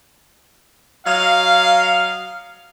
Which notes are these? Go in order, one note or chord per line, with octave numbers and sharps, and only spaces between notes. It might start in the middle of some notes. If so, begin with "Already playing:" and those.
F#3 D#5 F5